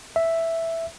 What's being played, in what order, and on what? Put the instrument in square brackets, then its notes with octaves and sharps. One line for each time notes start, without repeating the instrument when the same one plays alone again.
[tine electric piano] E5